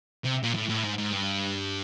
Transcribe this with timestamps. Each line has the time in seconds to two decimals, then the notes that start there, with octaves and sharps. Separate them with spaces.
0.25 C3
0.43 A#2
0.55 A2
0.69 A2
0.84 G#2
0.98 G#2
1.13 G2